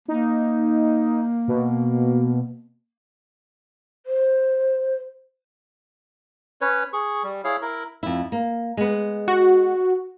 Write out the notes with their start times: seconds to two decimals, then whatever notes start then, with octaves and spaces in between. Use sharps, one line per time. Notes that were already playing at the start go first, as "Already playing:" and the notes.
0.08 A#3 D#4
1.48 B2
4.06 C5
6.61 C#4 B4 C#5
6.93 G#4 C#6
7.23 G3
7.44 E4 G#4 C#5 F5
7.62 E4 A#4
8.03 F2 E4
8.32 A#3
8.77 G#3 B3
9.28 F#4